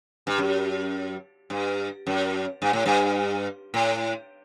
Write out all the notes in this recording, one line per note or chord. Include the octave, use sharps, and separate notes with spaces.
G2
F#2
G2
F#2
G2
A2
G2
A2